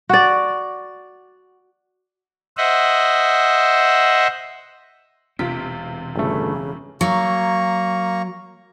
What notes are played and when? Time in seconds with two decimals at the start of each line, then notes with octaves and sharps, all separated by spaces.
0.09 F#4 D5
2.57 C5 D#5 E5 F#5
5.39 E1 C3 E3 C4 F4 B6
6.16 G1 C#3 A3
7.01 F#3 A#3 A#5 C#6